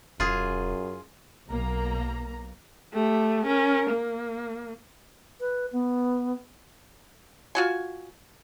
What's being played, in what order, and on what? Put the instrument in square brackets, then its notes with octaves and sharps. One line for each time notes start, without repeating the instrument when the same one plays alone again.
[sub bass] E1 [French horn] F#2 [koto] F4 G#4
[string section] B1 A#3 A#5
[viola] A3 G4
C#4 A#4
A#3
[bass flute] B4
B3
[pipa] F4 F#4 G#5